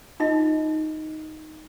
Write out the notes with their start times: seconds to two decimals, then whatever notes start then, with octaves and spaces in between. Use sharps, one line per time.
0.20 D#4 F4 D#5